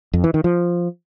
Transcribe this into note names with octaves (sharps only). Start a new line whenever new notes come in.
F2
E3
D#3
F3